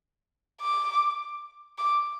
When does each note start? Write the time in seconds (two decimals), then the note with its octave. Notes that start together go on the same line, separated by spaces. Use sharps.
0.61 D6
1.78 D6